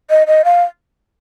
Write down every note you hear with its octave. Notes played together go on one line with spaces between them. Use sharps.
D#5
D#5
F5